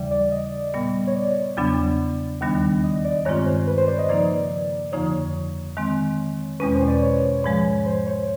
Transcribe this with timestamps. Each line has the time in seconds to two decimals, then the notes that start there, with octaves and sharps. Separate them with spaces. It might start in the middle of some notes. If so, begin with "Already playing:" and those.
Already playing: D#2 C#3 E3 G3 D5
0.11 D5
0.32 D#5
0.74 A#2 G3 B3
1.07 C#5
1.16 D5
1.57 E2 C#3 F#3 B3 D4
2.41 D#2 D#3 G3 B3 D4
2.83 D#5
3.04 D5
3.25 G2 D#3 G#3 C4 F4 C#5
3.46 C5
3.67 B4
3.78 C5
3.87 D5
3.99 D#5
4.09 C#3 F3 A#3 D#4 D5
4.92 F2 D3 F3 A#3 D#4 C#5
5.77 D#3 G#3 C4
6.60 E2 B2 G#3 C#4 B4
6.75 C5
6.82 C#5
6.88 D5
7.02 C#5
7.44 G#2 F3 G#3
7.86 C5
8.07 C#5